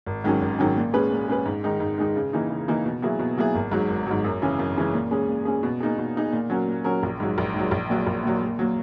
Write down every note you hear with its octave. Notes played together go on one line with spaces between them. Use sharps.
G#1
G#2 D#3 F#3 C#4
G#1
G#2 D#3 F#3 C#4
A#2
G#3 C#4 G#4 B4
A#2
G#3 C#4 G#4 B4
G#2
D#3 G#3 D#4
G#2
D#3 G#3 D#4
C#3
E3 A#3 D#4
C#3
E3 A#3 D#4
B2
F#3 A#3 E4 G#4
B2
F#3 A#3 E4 G#4
G#1
G#2 F#3
G#1
G#2 F#3
F#2
C#3 E3 G#3 C#4
F#2
C#3 E3 G#3 C#4
A#2
G#3 C#4 G#4
A#2
G#3 C#4 G#4
B2
A#3 D#4 G#4
B2
A#3 D#4 G#4
A#2
F#3 C#4 F#4 A#4
A#2
F#3 C#4 F#4 A#4
A#1
G#2 F#3
A#1
G#2 F#3
A#1
A#2 F#3
A#1
A#2 F#3
A#2
F#3 A#3